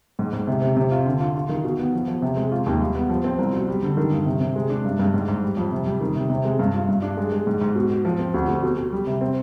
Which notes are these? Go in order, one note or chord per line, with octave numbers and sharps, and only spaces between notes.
G#2
G#2
C3
C3
C3
F4
D3
F4
F4
D#3
B2
B3
F3
F3
C3
G#3
F4
D#2
G3
B3
F3
C4
C2
B2
G3
D3
D#3
G2
C3
C3
G#3
D4
G2
G2
G#2
G#2
G3
F2
C3
G3
D#3
C3
C3
G#3
G2
F4
G2
D4
G#3
G#3
G#2
G#2
B2
B2
F3
C4
D2
D2
B2
B2
G3
C3
C4